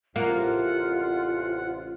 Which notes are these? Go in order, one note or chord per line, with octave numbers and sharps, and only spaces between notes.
A1 C3 A#3 F4 F#5